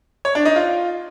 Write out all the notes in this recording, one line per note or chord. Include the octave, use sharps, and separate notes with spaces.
C#5
D4
D#4
F4